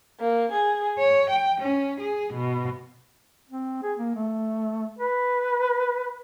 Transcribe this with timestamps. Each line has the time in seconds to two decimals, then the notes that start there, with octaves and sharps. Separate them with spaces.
0.20 A#3
0.52 G#4
0.97 C#5
1.30 G5
1.61 C#4
2.00 G#4
2.33 B2
3.50 C4
3.83 G#4
3.98 A#3
4.15 A3
4.99 B4